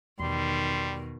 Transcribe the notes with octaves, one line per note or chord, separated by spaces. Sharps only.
E2 B2 D#3 G3 C6